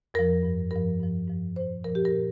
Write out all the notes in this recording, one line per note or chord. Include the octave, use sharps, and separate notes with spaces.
F2 F3 A#4
G2 F3
G2 F3 A#4
G2 F3
G2 F3
A#2 F3 C5
A#2 F3 A#4
G4
A#4
A#2